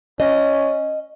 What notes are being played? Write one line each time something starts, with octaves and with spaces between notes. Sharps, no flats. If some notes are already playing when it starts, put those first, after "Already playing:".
C#4 D#5